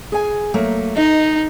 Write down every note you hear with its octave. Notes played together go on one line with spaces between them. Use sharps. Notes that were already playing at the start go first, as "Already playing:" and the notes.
G#4 G#5
F#3 A3 A#3
D#4 D#5